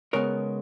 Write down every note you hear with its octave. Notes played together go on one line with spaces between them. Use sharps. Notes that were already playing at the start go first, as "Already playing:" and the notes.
C#3 G#3 B3 A#4 C#5